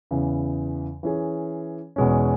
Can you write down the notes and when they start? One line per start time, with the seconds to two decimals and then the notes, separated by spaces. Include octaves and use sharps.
0.11 E2 C#3 E3
1.03 E3 C#4 G#4
1.96 E2 B2 G#3 C#4